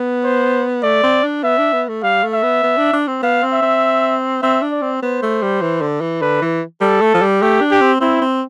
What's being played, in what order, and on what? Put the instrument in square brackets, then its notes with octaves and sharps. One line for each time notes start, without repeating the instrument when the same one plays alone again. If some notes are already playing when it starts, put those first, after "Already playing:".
Already playing: [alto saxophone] B3
[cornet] C5
[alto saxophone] A3 [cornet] D5
[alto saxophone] C4
D4
[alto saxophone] B3 [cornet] E5
[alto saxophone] D4
B3
A3
[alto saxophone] G3 [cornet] F5
[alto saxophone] A3
[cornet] E5
[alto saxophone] B3
B3
D4
D4
C4
[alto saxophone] B3 [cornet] F5
[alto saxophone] C4
[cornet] E5
[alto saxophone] C4
[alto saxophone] C4 [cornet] E5
[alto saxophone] D4
[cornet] D5
[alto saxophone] C4
[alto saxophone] B3 [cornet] C5
[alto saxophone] A3
G3
E3
D3
E3
[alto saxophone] D3 [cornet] B4
[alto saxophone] E3
[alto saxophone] G3 [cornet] A4
[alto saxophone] A3
F3
G3
[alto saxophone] A3 [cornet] G4
[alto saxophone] D4
[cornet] G4
[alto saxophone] C4
[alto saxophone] C4 [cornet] E4
[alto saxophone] C4